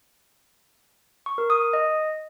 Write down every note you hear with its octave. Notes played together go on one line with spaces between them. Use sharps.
C#6
A#4
D#6
D#6
D#5